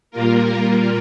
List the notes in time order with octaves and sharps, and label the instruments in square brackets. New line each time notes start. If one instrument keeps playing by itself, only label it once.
[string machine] A#2 G3 A#3 F4 A#4